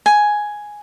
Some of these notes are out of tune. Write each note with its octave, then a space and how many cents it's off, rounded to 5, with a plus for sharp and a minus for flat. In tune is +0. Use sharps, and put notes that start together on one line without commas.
G#5 +5